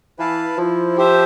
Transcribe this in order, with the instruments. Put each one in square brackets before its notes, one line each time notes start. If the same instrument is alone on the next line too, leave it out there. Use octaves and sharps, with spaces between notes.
[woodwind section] E3 [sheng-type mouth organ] E4 B4 F5 A5
[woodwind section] F3 [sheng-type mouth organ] E4
[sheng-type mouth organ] G4 C5 E5